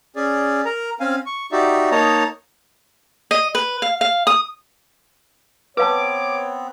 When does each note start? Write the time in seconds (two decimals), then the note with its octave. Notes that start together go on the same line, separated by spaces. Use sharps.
0.16 C#4 G#4 D5
0.65 A#4 A#5
1.00 C4 C#4 F5 G#5
1.26 C#6
1.52 D#4 F#4 G4 D5 E5
1.91 A#3 D#4 C#5 D#5 A5 A#5
3.31 D#5
3.55 B4
3.82 F5
4.01 F5
4.27 D#6
5.77 B3 C4 B4 C#5 F5 A5 D6